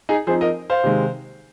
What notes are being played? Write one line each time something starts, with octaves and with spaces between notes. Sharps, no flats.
D#4 G#4
F3 C4 D#4 G#4 C5
A#4 D#5
C5 F5
C3 D#3 G#3